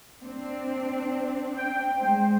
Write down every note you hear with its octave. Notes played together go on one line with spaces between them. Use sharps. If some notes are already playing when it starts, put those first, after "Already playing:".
C4 D4
G5
G#3 C5